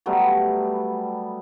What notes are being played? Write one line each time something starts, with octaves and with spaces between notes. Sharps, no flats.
F#3 G3 A3 B3